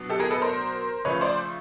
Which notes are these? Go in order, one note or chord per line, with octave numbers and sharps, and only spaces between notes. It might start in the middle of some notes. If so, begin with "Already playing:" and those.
Already playing: B2 F#3 B3 D4
G4 A4
G#4 A#4
A4 B4
A#4 C5
C#3 F3 A3 B4 C#5
C5 D5